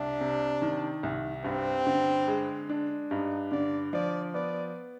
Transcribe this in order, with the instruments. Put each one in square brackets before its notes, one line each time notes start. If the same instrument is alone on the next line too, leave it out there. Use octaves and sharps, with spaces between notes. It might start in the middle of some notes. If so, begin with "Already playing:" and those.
Already playing: [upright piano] C2 [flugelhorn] D4
[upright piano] C3
D#3
C2
[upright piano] G2 [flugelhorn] C4
[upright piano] D3
G#3
D4
[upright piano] G2 [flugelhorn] D#4
[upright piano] D3 [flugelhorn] D5
[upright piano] F3 [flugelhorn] D5
[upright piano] B3 [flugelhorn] D5